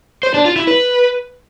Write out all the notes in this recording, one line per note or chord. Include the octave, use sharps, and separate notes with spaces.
C5
D4
F4
E4
B4